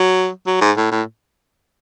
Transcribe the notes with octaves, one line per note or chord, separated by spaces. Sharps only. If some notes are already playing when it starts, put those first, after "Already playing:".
Already playing: F#3
F#3
G#2
A2
A2